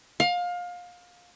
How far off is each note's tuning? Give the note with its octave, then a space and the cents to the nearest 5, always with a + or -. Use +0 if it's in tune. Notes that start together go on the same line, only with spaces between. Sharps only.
F5 +25